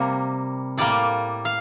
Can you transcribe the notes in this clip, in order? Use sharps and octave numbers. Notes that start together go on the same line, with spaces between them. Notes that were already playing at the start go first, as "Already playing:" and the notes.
Already playing: C3 G3 A#3 F4
A2 G3 A#3 D5
F5